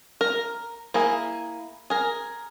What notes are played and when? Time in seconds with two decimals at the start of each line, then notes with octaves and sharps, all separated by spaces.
0.21 A#4
0.94 A#3 E4 G#4
1.90 G#4 A#4